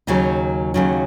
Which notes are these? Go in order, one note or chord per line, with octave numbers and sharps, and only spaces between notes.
D#2 C#3 F#3 D#4
D#2 C#3 F#3